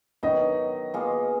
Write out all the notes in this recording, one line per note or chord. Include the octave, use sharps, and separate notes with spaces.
D#3 F#3 B3 D#5
B2 A#3 F4 G#4